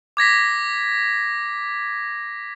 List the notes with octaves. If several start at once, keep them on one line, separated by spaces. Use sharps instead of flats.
D6 G#6 A#6 B6